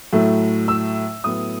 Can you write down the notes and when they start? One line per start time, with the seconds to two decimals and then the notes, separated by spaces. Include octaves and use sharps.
0.13 A2 F#3 A3
0.68 E6
1.24 A2 F#3 B3 D#6